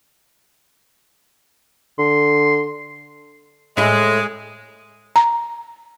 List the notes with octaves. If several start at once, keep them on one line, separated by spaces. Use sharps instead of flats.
D3 C6
A2 G#3 E4
A#5